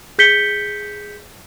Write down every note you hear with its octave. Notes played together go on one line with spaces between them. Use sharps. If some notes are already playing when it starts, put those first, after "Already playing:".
G#4 G6 B6 C#7 G7